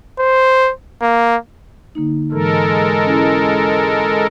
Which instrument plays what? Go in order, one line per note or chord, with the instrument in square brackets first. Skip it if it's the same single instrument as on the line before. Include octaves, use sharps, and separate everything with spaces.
[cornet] C5
A#3
[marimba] D3 A#3 D#4
[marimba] G#2 E3 [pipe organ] G#3 A4 A#4
[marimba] C#4 E4